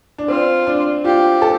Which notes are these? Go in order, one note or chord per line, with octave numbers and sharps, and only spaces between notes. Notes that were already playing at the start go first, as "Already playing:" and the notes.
D4
C4 F4
D4
F4 G4
A4